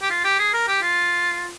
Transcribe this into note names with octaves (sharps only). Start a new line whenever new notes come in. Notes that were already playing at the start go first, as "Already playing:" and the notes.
G4
F4
G4
G#4
A#4
G4
F4